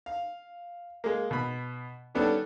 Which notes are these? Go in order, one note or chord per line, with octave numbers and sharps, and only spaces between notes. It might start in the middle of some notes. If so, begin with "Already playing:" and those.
F5
G#3 A#3
B2 B5
D#3 G3 B3 C#4 D4 A4